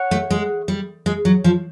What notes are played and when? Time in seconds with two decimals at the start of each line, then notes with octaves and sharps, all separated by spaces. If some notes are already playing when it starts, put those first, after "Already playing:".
Already playing: C#5 F#5
0.11 A3
0.30 G#3
0.68 G3
1.06 G#3
1.25 F#3
1.44 F3